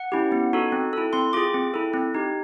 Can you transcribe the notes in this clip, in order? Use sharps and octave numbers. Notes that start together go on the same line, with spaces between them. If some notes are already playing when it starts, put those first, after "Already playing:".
Already playing: F#5
C#4 E4 G4
B3
D#4 F#4 A4
C4
E4 A4
C4 C6
F4 G#4 D6
C4
E4 A4
C4
D#4 G4